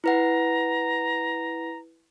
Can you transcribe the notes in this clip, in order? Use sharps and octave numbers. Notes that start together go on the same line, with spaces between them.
E4 B4 F#5 A#5